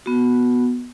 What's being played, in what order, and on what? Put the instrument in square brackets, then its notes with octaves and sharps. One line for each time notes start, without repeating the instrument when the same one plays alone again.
[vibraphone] B3 F#4